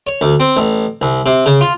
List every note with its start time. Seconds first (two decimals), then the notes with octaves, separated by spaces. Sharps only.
0.07 C#5
0.21 D2
0.40 C4
0.57 A1
1.02 C2
1.26 C3
1.46 C#3
1.61 F4